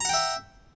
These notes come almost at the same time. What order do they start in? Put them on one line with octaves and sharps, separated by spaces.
A#5 F#5 G5 E5